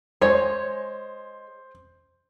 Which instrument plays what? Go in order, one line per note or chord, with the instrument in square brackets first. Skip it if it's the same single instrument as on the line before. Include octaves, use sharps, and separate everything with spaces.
[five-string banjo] G#3 C#5 [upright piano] C5